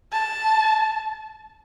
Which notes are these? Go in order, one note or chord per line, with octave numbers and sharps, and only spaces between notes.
A5